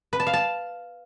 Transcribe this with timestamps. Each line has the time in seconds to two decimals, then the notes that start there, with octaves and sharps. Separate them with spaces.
0.13 B4
0.20 A5
0.27 F5
0.33 A5